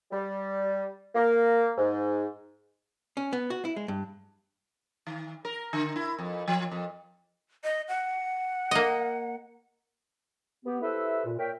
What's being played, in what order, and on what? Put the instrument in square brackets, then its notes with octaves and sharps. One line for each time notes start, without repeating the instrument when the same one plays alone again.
[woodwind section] G3
A#3
G#2
[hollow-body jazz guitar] C#4
B3
F#4
E4
G#3
G2
[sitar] D#3
A#4
D3
E4
F2
F3
F2
[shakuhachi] D#5
F#5
[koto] A#3 D#5
[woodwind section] B3 G4
E4 G4 A4 B4 C5 E5
A#2
A#2 A#4 C#5 E5 G5